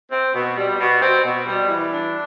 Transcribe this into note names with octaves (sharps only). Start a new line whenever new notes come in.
C4
B2
G3
B2
C4
B2
G3
E3
D4